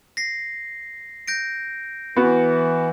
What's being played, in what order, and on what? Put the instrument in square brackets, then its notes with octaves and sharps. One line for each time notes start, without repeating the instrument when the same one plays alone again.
[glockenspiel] A#6 C7
G6 A#6 D7
[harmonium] E3 [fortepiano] B3 F#4